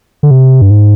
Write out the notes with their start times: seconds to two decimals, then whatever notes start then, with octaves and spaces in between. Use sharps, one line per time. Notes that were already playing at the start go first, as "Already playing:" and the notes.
0.23 D3
0.31 C3
0.62 G2
0.71 G#2